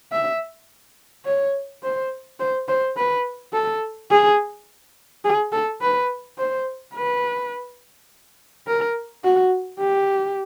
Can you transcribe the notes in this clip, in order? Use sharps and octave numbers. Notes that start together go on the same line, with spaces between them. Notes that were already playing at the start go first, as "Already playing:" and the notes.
E5
C#5
C5
C5
C5
B4
A4
G#4
G#4
A4
B4
C5
B4
A#4
F#4
G4